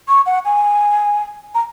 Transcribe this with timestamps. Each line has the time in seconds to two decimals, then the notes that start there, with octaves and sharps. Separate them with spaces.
0.08 C#6
0.26 F#5
0.45 G#5
1.55 A#5